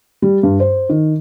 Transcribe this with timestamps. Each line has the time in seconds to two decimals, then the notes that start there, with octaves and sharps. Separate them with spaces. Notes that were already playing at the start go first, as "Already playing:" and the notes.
0.22 G3
0.43 G2
0.60 C5
0.89 D#3